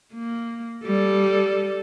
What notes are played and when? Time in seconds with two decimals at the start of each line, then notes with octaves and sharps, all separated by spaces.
0.14 A#3
0.86 G3 A4